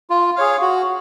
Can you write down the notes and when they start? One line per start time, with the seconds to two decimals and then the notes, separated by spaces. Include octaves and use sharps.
0.10 F4
0.36 G#4 C#5 F5
0.62 F#4